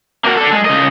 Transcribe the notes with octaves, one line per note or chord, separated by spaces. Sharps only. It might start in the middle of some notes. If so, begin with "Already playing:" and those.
A#3 F#4
D4 A4
G#3
C#3 D#5